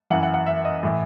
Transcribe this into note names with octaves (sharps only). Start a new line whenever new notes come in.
F#2 E3 F#5
F#5
F#5
E5
D#5
A2 E3